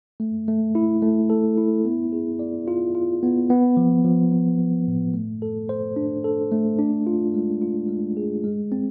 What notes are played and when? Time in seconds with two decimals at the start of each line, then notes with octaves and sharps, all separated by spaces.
0.20 A3
0.48 A3
0.75 E4
1.02 A3
1.30 A4
1.58 E4
1.85 B3
2.12 G#4
2.39 D5
2.68 F4
2.95 F4
3.23 B3
3.50 B3
3.77 F3
4.04 F3
4.32 F3
4.59 F3
4.87 A2
5.14 A3
5.42 A4
5.69 C5
5.96 D4
6.24 A4
6.52 A3
6.79 D4
7.07 F4
7.34 G#3
7.62 F4
7.89 G#3
8.17 G#4
8.44 G#3
8.72 C4